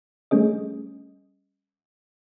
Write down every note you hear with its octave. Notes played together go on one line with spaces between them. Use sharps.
G3 A3 C#4 G#4 D#5